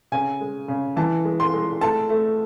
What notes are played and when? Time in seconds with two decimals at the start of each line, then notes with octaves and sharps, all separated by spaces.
0.12 C#3 G#5
0.40 G#3
0.68 C#3
0.96 E3 A5
1.25 G#3
1.40 C6
1.54 G#3
1.81 A3 A5
2.09 A3